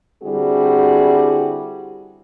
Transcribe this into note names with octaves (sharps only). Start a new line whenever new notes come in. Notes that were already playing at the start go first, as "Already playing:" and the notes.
D3 G3 C4 E4 F#4 G#4